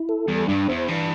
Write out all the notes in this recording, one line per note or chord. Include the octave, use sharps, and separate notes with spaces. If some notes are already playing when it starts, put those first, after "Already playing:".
Already playing: E4
A4
E2 G3
G2 D4
E2 C5
G2 E3